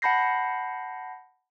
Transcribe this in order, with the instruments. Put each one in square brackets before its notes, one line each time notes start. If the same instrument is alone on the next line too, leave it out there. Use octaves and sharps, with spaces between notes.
[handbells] F#5 A5 B5 G6 A#6 C7